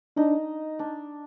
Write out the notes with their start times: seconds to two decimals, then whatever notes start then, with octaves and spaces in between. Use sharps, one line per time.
0.17 D4 D#4
0.79 D4